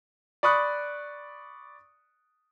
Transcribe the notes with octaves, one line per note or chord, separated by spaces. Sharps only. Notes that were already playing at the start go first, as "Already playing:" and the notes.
D5 B5 C#6 D#6 F#6